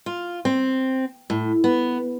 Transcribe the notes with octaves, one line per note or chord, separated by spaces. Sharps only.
F4
C4
A2
B3